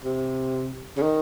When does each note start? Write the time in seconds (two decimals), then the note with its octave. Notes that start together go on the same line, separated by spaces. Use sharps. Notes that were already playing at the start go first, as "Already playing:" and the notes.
0.04 C3
0.97 C#3
1.03 D#3